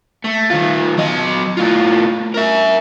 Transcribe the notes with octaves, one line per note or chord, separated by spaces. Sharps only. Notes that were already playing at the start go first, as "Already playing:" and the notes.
A3
D#3 F4
F#3 D#5
A2 F4
A#4 E5